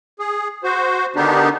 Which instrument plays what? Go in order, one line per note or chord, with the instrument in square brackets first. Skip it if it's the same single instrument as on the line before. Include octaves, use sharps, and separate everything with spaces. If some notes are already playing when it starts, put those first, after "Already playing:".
[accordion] G#4
F#4 C5
D3 D#3 B3 D4 D#4 G4